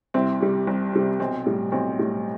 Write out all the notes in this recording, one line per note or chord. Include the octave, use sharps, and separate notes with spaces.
C2 C4 E4
C3 G3
C2
C3 G3
B1 C4
A2 G3
B1 C4
A2 G3